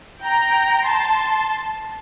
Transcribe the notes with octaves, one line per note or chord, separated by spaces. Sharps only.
G5 A#5
A5 C6